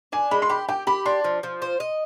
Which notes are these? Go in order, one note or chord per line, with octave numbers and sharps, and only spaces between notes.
D4 G#5
G#3 B5
C6
G4 B5
G4 G5
G4 B5
D4 C6
F3
F3
C5
D#5